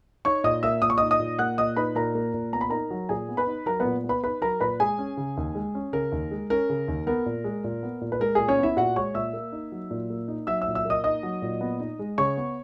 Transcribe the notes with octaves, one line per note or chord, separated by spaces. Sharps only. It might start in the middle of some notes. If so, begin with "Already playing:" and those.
D#4 C#5 C#6
A#2 D#5 D#6
A#3 E5 E6
A#2 D#6
C#6
D#4 D#5 D#6
D#5 D#6
A#2
A#3 F#5 F#6
A#2 D#5 D#6
D#4 B4 B5
A#2 A#4 A#5
A#3
A#2
B3 A#5
B5
D#4 A#4 A#5
F#3
A#2 G#4 G#5
B3
B4 B5
D#4
F#3 A#4 A#5
A#2 B3 B4
B3
B4 B5
D#4 B4 B5
F#3 A#4 A#5
A#2 B4 B5
G#3 G#4 G#5
C#4
C#3
D#2
G#3
C#4
C#3 A#4
D#2
G#3
C#4 A#4
C#3
D#2
B3 A#4
A#2
G#3
A#2
B3
A#2
B4
G#3 A#4
A#2 G#4
C#4 C#5
B3
E4 E5
A#2 F#4 F#5
G#3 C#5 C#6
A#2 E5 E6
A#3
D#4
F#3
A#2
A#3
D#4
F#3 E5 E6
E5 E6
A#2
E5 E6
A#3 D#5 D#6
D#4 D#5 D#6
F#3
A#2
B3
D#4
G#3
C#3 C#5 C#6
B3